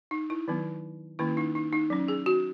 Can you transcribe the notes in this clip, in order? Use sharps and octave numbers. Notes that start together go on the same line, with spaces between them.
D#4
E4
D#3 F#3 B3
D#3 A#3 C#4 E4
D#4
D#4
D#4
F#3 C#4
G#4
F#4